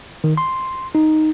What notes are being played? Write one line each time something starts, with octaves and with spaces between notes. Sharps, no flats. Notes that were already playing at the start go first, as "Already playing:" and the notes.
D#3
C6
D#4